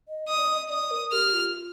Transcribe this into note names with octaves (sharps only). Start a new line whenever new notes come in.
D#5
D#5 D#6
D5
D#5
D#5
D5 D#6
A#4
G4 F6
F4